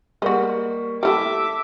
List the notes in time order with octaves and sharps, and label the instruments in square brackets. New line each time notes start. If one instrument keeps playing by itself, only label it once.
[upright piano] G3 A#3 C#6 [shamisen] G#3 F#4
[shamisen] G3 E4 G4 [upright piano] A4 [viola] E5 D6